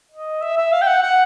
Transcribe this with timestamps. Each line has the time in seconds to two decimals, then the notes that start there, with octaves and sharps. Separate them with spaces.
0.12 D#5
0.42 E5
0.57 E5
0.72 F5
0.82 G5
0.88 F#5
1.02 F#5